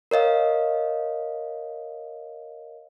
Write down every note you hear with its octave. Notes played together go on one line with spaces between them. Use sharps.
A#4 C#5 D#5 F5